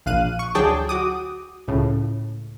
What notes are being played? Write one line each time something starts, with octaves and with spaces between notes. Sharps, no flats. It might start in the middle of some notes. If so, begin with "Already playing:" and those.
A#1 F5 F#6 D#7
C#6
D2 F#3 G#4 G5 A5 D6
F#4 D6 D#6
C#2 A2 C#3